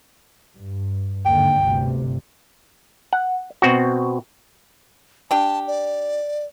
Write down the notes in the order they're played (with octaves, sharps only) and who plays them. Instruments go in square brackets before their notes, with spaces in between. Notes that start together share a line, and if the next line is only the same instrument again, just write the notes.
[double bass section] G2
[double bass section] D#2 G#2 D3 [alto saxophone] G5
[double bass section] G1 D2 C3
[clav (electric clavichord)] F#5
B2 C4 F#4
[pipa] D4 G4 [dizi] A5
[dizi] D5